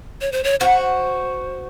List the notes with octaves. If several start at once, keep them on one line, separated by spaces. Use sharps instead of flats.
C#5
C5
C#5
F#4 C5